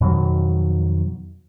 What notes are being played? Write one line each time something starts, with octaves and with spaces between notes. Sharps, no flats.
F2 B2 D#3 F#3